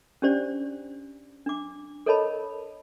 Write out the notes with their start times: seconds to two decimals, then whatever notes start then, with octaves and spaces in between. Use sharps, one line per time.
0.22 C#4 D4 G4 C5 D5
1.46 D4 D6
2.06 A4 A#4 C#5 D#5 A5 B5